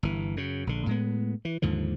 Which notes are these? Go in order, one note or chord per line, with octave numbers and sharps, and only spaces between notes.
G1 E3
F#2 C#3
A#1 D3
A2 G#3 B3
E3
D#2 G#2 D3 F3